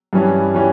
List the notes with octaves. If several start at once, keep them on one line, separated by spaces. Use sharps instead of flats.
G2 E3 G3 C#4
E3 G3 C#4